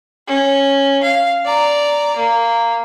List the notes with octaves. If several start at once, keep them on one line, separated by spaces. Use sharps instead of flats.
C#4
F5
D5 A#5
A#3